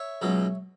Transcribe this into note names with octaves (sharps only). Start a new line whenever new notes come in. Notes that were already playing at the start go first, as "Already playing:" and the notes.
Already playing: C#5 E5
C#2 B2 F#3